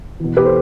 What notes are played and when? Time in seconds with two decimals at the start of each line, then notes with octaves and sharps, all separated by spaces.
0.20 E2 B2
0.37 G4 B4
0.45 A4 C5